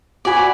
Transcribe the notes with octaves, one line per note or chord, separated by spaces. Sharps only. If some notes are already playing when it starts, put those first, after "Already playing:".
F#4 D5 G#5 B5